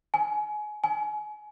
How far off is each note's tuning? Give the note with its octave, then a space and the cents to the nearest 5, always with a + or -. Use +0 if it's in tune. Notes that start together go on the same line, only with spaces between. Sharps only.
G#5 +25
G#5 +30